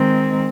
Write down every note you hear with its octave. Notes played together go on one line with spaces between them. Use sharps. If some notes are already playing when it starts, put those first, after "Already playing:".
Already playing: D#3 G#3 C4